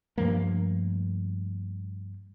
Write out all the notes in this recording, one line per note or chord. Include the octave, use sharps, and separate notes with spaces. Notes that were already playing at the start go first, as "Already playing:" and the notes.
G2 F3 A3 A#3